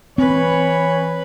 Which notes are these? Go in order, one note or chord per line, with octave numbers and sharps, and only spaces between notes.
E3 C4 B4 C#5